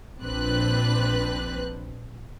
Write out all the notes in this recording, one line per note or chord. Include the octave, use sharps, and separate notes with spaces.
A#1 C4 D4 B4 F#6